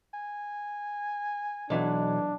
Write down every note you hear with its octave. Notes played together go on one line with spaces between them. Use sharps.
G#5
B1 E3 F#3 D4